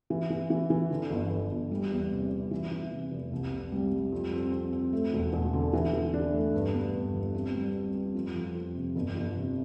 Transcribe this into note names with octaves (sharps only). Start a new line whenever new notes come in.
E3
E3
E3
E3
D3
G1
G1
G1
G3
E2
C3
C3
E3
E3
C3
F1
C2
C3
G3
G3
F2
C4
C4
C4
A3
E1
E1
D3
E3
E3
D4
A3
G2
B3
G2
G1
C4
G3
C4
C4
F2
F3
F2
C3
G1
G1
C3